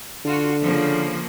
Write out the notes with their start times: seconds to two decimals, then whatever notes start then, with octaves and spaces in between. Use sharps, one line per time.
0.25 D3 F4 F#4
0.62 C#3 F3 A#3